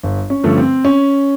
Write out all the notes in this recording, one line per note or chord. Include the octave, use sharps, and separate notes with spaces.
G1
C#4
G2 D3 F3 A3
C4
C#4